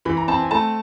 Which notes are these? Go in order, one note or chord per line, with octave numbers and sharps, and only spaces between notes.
E3 B5
A#5
C4 A5
G#5
A3 A5